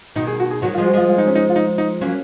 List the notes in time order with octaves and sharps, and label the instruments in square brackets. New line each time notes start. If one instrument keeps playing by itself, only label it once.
[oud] B2 D#3 [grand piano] D#4
[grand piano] G#4
F#4
G#4
[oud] D#3 F#3 [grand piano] F#4
[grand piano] F4
[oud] F3 G#3
[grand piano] F#4
[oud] F3 G#3 [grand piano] F4
[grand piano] F4
D#4
C#4
D#4
F4
D#4
D#4
[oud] F#3 A#3 [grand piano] C#4